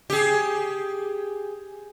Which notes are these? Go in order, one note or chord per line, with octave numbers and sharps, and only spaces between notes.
G4 G#4